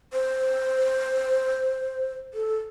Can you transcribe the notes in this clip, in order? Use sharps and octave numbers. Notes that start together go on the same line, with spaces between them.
C5
A4